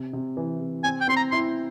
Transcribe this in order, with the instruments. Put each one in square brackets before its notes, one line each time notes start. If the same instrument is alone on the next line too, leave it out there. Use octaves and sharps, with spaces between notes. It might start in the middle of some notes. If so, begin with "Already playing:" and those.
Already playing: [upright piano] C3
C3
E3
C3
[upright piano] C4 [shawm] G#5
[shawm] G5
[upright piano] C4 [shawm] C6
[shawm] A#5
[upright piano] E4 [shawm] C6